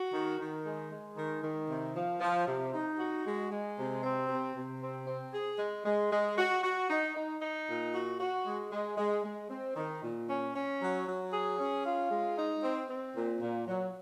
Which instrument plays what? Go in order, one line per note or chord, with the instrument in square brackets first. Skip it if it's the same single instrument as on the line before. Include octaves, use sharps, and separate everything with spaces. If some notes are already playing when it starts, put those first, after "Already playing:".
Already playing: [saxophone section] F#4
D#3
D#3
G#3
G#3
D#3
D#3
C3
F3
F3
C3
D#4
F#4
G#3
G#3
C3
C4
C3
C3
C4
C4
G#4
G#3
G#3
G#3
F#4
F#4
D#4
D#4
D#4
A#2
F#4
F#4
G#3
G#3
G#3
G#3
C4
D#3
A#2
C#4
C#4
F#3
F#3
G#4
C#4
F4
G#3
D#4
C4
C4
A#2
A#2
F#3